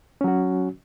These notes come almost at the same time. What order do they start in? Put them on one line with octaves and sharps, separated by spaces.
C#4 F#3 F#4